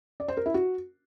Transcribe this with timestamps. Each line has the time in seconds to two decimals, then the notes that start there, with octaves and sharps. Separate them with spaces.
0.20 D5
0.28 C5
0.37 A#4
0.46 E4
0.54 F#4